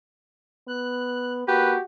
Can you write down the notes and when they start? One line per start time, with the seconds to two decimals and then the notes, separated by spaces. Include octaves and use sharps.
0.68 B3 F#6
1.48 A#3 F#4 G4 B4